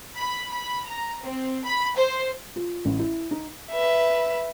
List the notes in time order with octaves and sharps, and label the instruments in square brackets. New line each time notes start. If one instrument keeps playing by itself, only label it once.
[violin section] B5
B5
A#5
C4
B5
C5
[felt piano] F4
A1
E4
D#4
[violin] B4 E5